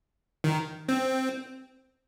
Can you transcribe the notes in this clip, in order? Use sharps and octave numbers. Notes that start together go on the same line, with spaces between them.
D#3
C4